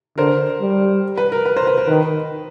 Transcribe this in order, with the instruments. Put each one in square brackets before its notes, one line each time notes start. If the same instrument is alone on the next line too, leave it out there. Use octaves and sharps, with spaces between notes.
[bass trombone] D3 [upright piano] A#4 C5
[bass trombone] G3
[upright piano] B4
A#4
B4
A#4 C5
B4
A#4
[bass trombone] D#3 [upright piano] B4